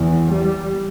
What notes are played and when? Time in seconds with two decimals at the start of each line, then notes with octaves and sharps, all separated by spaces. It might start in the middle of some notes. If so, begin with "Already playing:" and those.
Already playing: E2
0.32 G3